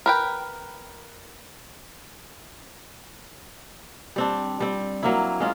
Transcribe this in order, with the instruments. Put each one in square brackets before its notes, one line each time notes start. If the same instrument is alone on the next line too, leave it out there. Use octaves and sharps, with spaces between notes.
[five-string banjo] A#4 B4 G5
[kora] G3 C4 D4
G3 C4
F#3 A#3 E4
G#3 C#4 F4